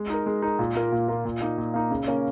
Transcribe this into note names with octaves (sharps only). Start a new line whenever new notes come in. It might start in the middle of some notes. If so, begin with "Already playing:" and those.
Already playing: G#3
D#4 A#4
G#3
D#4 A#4
A#2
A#3 F4 A#4
A#2
A#3 F4 A#4
A#2
A#3 D#4
A#2
A#3 D#4
C#3
A#3 C#4 A#4